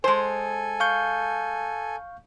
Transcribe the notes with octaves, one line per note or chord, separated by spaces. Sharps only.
G#3 A4 C5 G#5
F5 C#6 G6